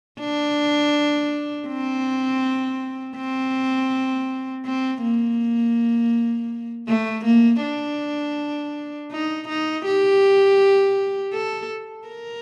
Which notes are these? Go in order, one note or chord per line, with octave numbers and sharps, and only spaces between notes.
D4
C4
C4
C4
A#3
A3
A#3
D4
D#4
D#4
G4
A4
A#4